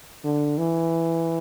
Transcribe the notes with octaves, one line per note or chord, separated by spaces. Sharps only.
D3
E3